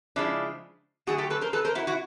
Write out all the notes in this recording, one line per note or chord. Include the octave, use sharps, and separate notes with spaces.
C#3 F3 G#3 D4 E4
D3 F#3 A3 F#4 G#4
G4 A4
A4 B4
A#4 C5
A4 B4
A#4 C5
E4 F#4
E4 F#4